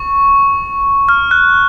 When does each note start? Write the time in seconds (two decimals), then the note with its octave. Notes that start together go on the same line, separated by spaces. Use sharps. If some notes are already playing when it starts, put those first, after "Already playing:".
Already playing: C#6
1.09 F6
1.31 F#6